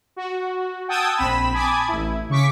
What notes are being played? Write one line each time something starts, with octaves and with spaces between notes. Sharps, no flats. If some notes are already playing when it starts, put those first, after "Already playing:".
F#4
F#5 G5 A5 D#6 E6 G#6
A#1 C4 B5 E7
G#5 A5 B5 D6 D#6 G#6
A1 E4
C#3 C#6 D6 B6